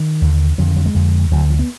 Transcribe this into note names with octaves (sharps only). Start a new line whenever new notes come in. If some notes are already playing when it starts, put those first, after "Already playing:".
Already playing: D#3
D#2 D3
F2 D3 F#3
D#3
F#3
G#3
F2 D3
D2 D3 F#3
F3
B3